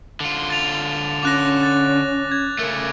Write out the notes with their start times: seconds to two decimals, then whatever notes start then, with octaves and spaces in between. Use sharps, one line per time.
0.20 D3 F4
0.50 A6 F7
1.23 C#4 D6 F#6 A#6
1.63 A6
2.31 G#6
2.59 C#3 A3 A#4